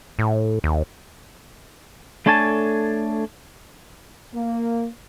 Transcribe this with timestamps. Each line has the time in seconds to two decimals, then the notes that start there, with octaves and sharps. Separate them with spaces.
0.19 A2
0.64 D#2
2.26 A3 D4 A4 C#5 G#5 A5
4.34 A#3